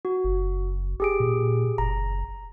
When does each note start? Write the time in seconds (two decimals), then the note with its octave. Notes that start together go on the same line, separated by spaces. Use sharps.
0.05 F#4
0.24 F#1
1.00 G4 G#4 D7
1.20 A#2
1.78 F#1 A#5